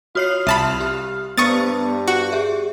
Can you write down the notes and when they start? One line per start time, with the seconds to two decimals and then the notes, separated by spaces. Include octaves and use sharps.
0.15 F4 F#4 C#5 D#6 F6 C7
0.47 C2 E5 A5 B5
0.80 G4
1.37 G2 B3 C5 C#6 D#6 A6
2.08 F#4
2.32 G4 G#4 E5